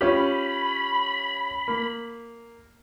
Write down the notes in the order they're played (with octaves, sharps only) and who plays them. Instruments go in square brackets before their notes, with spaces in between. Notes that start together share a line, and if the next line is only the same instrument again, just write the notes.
[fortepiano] C#4 F4 G4 [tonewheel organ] B5
[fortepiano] A#3